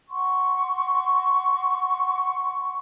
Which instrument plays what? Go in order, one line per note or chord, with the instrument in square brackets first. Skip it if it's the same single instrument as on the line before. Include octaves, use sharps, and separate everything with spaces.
[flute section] F#5 C6 C#6